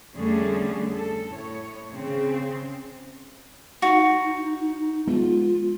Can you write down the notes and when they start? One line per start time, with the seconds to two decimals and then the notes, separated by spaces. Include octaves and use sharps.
0.15 F2 D3 G3 A3 C#4 G#4
0.92 A4
1.31 A2 C#5
1.92 C#3 C4
3.82 D#4 F#4
5.07 G#3 B3 F4